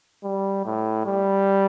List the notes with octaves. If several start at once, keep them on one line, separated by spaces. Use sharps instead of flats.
G3
A2
G3